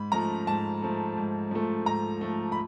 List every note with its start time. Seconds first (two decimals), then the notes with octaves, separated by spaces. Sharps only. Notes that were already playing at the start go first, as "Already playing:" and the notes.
Already playing: G#2 B5
0.12 F3 A3 A#5
0.47 G#2 A5
0.82 F3 A3
1.17 G#2
1.51 F3 A3
1.86 G#2 A#5
2.21 F3 A3
2.52 B5